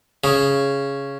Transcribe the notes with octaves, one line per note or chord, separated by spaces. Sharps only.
C#3